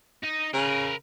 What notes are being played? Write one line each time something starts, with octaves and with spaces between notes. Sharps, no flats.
D#4 D#5
C#3 A#4 B4